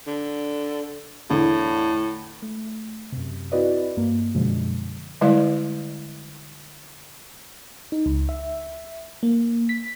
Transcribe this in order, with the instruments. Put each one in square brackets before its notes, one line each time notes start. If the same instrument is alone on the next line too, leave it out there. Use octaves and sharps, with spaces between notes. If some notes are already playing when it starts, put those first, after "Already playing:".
[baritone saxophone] D3
[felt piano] E2 D3 [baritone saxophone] A2
[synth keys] A3
F#2 C3
C4 E4 F#4 B4 D5 D#5
G2 A#3
F#2 B2 D3 F3 G#3
[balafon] D3 G3 G#3 E4 D5 F5
[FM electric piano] D#4
C#2
E5
A#3
B6